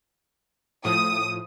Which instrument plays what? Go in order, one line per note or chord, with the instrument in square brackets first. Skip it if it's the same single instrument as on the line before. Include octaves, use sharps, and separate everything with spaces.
[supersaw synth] A2 F3 [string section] D#6